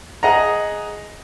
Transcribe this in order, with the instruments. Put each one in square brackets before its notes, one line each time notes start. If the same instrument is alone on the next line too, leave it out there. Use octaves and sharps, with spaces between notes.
[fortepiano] G#4 D#5 F#5 A#5